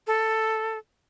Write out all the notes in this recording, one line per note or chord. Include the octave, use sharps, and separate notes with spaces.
A4